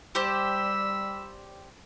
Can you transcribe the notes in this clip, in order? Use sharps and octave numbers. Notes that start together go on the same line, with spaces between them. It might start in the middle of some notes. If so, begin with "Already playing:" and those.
G3 G4 C5 D5 B5 E6